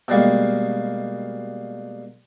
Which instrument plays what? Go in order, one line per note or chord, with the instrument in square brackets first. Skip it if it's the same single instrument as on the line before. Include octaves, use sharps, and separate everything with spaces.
[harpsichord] B2 G3 G#3 A#3